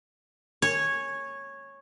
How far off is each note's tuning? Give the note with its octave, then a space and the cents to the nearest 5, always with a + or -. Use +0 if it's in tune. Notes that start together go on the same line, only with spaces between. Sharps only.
C#5 -10 G#5 +0